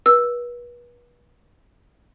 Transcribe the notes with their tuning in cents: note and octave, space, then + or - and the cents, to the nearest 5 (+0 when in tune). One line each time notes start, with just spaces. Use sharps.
B4 -35 E6 +0